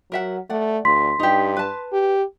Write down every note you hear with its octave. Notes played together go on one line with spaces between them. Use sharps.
F#3 A#4 E5 F#5
A3 D5 F#5
D2 C6 B6
G2 D#4 G4
B4 A5
G4